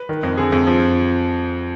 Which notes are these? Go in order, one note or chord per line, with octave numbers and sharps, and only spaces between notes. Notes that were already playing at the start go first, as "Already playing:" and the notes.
Already playing: B4
D#3
F2
D3 G#4
F2
F3